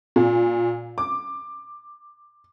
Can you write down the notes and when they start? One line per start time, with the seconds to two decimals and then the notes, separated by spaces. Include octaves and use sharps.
0.16 A#2
0.98 D6